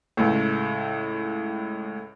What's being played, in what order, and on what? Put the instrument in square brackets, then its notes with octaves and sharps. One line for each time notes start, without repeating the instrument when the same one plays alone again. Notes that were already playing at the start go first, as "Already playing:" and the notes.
[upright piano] C#2 A2